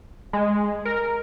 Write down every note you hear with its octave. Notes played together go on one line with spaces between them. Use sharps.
G#3
A#4